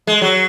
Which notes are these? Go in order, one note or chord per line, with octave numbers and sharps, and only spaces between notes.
G#3
F#3